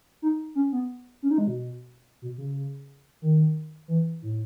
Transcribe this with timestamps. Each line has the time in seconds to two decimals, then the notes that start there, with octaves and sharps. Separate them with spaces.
0.22 D#4
0.55 C#4
0.73 B3
1.22 C#4
1.31 D#4
1.38 G#3
1.47 B2
2.22 B2
2.38 C#3
3.22 D#3
3.88 E3
4.22 A2